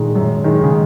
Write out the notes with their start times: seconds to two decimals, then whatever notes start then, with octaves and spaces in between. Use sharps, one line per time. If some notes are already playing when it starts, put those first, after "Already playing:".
Already playing: A#2 D#3 G#3
0.15 F#2
0.44 D#3 G#3
0.64 C#3